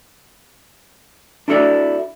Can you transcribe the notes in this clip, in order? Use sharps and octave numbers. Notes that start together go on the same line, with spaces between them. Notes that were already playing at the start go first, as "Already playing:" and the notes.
D4 E4 F#4 A4 B4 D5